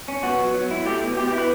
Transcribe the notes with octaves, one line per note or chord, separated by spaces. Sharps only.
C#4
B3 F#4
F#3
F#3
E4
A3 G4
B2
B2 G4
G4
E4
B4